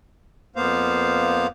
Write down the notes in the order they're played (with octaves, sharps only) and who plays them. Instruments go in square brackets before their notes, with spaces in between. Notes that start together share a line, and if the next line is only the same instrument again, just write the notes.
[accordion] F2 A#3 B3 C5 F5